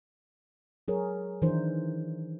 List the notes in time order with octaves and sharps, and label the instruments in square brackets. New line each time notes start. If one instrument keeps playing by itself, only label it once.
[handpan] F#3 G#4 A#4 C#5
D#3 E3 D4 E4 A#4 C5